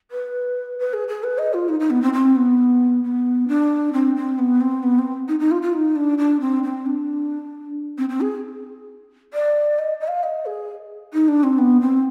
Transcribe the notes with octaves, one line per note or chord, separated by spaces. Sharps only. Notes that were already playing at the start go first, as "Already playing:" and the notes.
B4
B4
G#4
G#4
B4
D#5
F4
D#4
D#4
B3
C4
C4
B3
B3
D4
C4
C4
B3
C4
B3
C4
D#4
D#4
F4
F4
D#4
D4
D4
C4
C4
D4
C4
C4
G#4
D5
D#5
D#5
F5
D#5
G#4
D#4
D4
C4
B3
C4